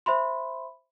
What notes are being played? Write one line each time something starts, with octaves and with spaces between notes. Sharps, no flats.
C5 E5 B5 C6